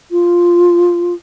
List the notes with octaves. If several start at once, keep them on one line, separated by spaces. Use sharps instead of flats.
F4